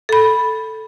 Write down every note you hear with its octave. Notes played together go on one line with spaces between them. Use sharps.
A4 B5